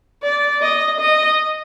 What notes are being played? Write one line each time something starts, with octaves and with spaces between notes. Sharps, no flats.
D5
D#5
D#5